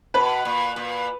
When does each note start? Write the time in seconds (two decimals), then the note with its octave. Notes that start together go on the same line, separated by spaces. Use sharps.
0.14 B2 B4
0.45 A#2
0.76 A#2